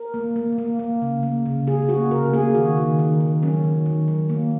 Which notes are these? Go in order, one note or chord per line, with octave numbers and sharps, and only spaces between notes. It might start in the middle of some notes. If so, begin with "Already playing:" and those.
Already playing: A#4
A#3
A#3
A#3
A#3
C#3
A#3
C#3
C#3 G#4
A#3 F#4
C#3 A#4
A#3 G#4
D#3 F#4
D#3
D#3
D#3
F#3 C#4
D#3
D#3
F#3
A#3